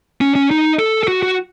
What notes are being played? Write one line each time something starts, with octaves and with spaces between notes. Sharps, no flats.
C#4
C#4
D#4
A4
A4
F#4
F#4